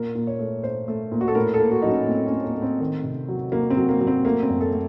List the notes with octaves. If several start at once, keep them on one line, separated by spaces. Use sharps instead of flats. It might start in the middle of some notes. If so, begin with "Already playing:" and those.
Already playing: A#2 A#4
A#2
C#5
A3
A3 C5
A3
A#2
F#4
A4
A2 A#4
A4
A#3
F#4
F#3 D#4
C#4
A2 C4
C#4
A2
A#3
A2
C4
D#3
C3
F#3
F#3 A#3
C4
F#3
A#3
F#3
C4
A3 A#3
C4
F#2
A4
A3